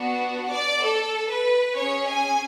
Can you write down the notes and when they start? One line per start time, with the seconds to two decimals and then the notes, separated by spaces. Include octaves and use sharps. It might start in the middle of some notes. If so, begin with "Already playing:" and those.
Already playing: B3 D4 F#4
0.50 D5
0.82 A4
1.29 B4
1.75 C#4 G#4 C#5
2.07 G#5